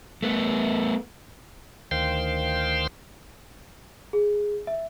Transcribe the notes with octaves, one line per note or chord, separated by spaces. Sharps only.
A3 B3
D2 D#3 C5 F5 G5 C6
G#4
E5